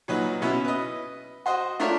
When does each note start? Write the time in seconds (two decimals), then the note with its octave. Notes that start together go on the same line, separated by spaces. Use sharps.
0.08 A#2 F#3 D#4 B4
0.42 B2 B3 C#4 E4
0.65 B4 D#5
1.46 F#4 C5 D#5
1.80 A3 D4 F4 A#4 C#5